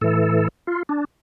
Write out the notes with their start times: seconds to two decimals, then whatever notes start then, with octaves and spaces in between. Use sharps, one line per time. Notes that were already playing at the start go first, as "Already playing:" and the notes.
0.01 A2 E3 A4
0.67 F4
0.89 D4